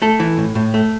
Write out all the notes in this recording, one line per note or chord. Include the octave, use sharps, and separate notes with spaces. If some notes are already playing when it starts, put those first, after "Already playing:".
A3 A4
E3
A2
A2
A3